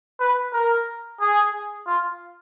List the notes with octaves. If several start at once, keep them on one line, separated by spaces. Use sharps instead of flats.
B4
A#4
G#4
F4